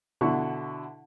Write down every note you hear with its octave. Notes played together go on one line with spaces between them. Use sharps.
B2 D3 E4 C#6